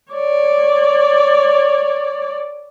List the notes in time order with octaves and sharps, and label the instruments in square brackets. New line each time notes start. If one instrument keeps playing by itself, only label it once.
[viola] C#5 D5